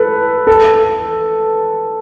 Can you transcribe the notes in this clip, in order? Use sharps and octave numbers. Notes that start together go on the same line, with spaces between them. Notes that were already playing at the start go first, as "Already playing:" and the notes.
Already playing: A4 B4
A4